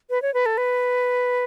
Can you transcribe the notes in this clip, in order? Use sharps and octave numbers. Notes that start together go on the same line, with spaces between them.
B4
C#5
B4
A4
B4